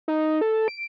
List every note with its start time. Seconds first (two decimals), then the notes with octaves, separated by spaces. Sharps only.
0.08 D#4
0.41 A4
0.68 D7